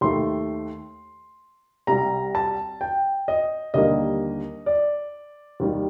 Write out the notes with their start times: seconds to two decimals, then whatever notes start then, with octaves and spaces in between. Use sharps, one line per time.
0.01 D#2 D#3 A3 C6
1.87 C2 C3 G3 A#5
2.35 A5
2.81 G5
3.28 D#5
3.74 D#2 D3 G3 A#3 D#5
4.66 D5
5.60 D#2 D#3 G3